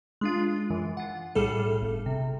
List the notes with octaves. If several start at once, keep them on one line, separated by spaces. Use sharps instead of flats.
G#3 D4 F4
F#2 E3
F4 F#5
B1 A2 G3 G#4 A4 F6
G1
C3